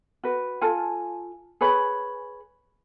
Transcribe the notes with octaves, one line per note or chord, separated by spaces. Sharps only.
F#4 B4
F4 A4 G#5
G#4 B4 C#5 B5